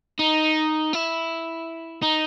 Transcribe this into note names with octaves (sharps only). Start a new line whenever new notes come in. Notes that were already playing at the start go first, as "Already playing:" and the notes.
D#4
E4
D#4